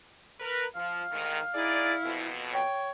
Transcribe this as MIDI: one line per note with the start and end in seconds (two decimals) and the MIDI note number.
0.40 0.65 70
0.40 0.65 71
0.76 1.02 53
0.76 2.22 77
1.11 1.39 38
1.11 1.39 44
1.11 1.39 51
1.54 1.92 63
1.54 2.29 64
1.54 1.92 68
1.54 1.92 74
2.04 2.59 41
2.04 2.59 47
2.54 2.92 73
2.54 2.90 79